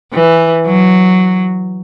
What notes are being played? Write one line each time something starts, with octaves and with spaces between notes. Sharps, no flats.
E3
F#3